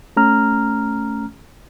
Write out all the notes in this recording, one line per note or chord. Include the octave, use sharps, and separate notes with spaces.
A3 C#4 A#5 F6